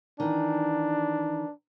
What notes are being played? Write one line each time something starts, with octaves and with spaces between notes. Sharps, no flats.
D#3 E3 D4